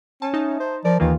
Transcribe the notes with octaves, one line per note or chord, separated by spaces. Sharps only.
C#4 A5
D#4 E5 A5
C5
F3 A#4 D5
D#2 D#3 E3 A#3 F4